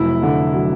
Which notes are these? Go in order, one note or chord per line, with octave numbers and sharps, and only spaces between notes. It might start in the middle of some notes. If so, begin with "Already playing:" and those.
Already playing: F1 F#3 E4
D3
F#3